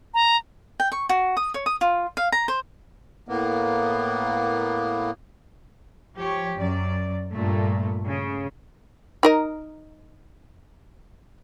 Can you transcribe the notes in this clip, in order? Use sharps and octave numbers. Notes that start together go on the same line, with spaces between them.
A#5
G5
C#6
F#4
D#6
C#5
D#6
F4
F5
A#5
C5
A2 A#3 B3
F3 G4 C#5
F#2 D5
G2 A#2 A3
C#3
D#4 A#4 D#5